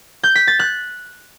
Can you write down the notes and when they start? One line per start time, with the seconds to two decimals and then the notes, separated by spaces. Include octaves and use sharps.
0.23 G6
0.35 B6
0.47 A6
0.59 F#6